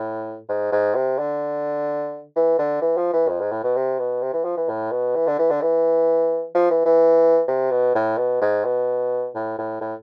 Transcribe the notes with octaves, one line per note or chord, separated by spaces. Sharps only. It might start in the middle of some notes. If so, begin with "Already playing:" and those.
Already playing: A2
G#2
G#2
C3
D3
E3
D3
E3
F3
E3
F2
G#2
A2
B2
C3
B2
C3
E3
F3
E3
A2
B2
E3
D3
E3
D3
E3
F3
E3
E3
C3
B2
A2
B2
G#2
B2
A2
A2
A2